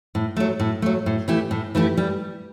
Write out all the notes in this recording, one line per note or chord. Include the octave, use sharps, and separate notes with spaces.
A2
F#3 A3
A2
F#3 A3
A2
E3 A3 E4 G4
A2
E3 A3 E4 G4
G3